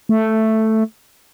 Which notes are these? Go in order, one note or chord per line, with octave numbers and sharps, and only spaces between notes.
A3